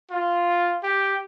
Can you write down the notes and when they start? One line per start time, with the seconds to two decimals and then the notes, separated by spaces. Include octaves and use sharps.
0.11 F4
0.83 G4